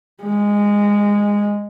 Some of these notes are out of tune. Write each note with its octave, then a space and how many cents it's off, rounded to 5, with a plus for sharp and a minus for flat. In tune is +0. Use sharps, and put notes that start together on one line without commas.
G#3 -15